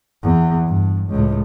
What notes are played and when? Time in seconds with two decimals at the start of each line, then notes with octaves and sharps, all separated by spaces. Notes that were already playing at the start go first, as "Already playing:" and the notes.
0.23 E2
0.67 G2
1.09 C#2 A2